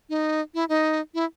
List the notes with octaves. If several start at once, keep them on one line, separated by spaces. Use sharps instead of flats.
D#4
E4
D#4
E4